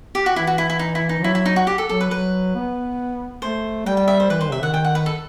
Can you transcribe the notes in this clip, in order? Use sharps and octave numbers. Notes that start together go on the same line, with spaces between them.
G4
F#4
E3 E4
F#4
E4
E4
D#4
E4
D#4
E3
F#3 E4
E4
D#4
F#4
G4
A4
F#3 A4
B4
F#3 B4
B3
A3 C5
G3 G5
G5
E5
C5
E3 B4
D#3 C5
C3 E5
D#3 F#5
G5
F#5
B4
A4